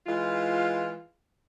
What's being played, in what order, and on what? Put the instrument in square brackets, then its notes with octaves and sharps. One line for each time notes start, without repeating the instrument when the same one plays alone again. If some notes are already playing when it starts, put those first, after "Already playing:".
[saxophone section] E3 G#3 F4